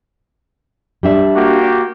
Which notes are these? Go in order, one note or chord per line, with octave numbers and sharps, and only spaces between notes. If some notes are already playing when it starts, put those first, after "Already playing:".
G3 D4 E5
A#3 F#4 G4